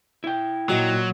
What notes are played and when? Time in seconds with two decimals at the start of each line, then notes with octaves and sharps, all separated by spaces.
0.24 E4 G5
0.69 A#2 F#3 F#4 D#5